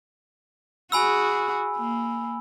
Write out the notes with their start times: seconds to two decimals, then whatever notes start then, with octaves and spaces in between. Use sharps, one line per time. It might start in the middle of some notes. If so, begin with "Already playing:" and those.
0.92 F#4 G#4 G#5 B5 E6
1.77 A#3